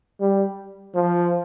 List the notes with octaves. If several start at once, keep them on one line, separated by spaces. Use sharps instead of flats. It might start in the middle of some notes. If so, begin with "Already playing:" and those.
G3
F3